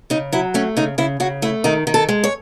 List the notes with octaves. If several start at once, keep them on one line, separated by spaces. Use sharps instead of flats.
C#3 D#4
F#3 E4
A3 C#4
C#3 D#4
C#3 E4
C#3 F#4
A3 E4
D#3 D#4
D#3
A4
G#3
C#5